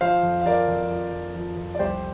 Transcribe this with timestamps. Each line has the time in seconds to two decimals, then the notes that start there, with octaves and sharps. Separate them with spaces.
0.01 F3 C5 F5
0.23 F2
0.41 F5
0.46 F3 A#4 D5
0.68 F2
0.91 F3
1.12 F2
1.35 F3
1.57 F2
1.75 D5
1.79 C2 G4 C5